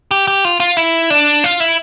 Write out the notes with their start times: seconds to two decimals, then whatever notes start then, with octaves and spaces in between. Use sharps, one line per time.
0.11 G4
0.28 G4
0.45 F4
0.60 F4
0.77 E4
1.10 D4
1.44 F4
1.60 E4